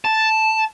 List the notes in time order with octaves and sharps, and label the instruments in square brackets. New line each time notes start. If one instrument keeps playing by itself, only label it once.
[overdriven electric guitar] A5